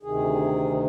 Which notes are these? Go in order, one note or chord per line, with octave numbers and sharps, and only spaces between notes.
D2 C3 D#3 G#4